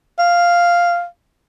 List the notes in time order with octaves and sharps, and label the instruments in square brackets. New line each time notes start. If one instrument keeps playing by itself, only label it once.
[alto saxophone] F5